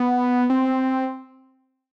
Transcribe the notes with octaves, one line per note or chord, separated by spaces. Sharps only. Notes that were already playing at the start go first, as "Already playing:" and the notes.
Already playing: B3
C4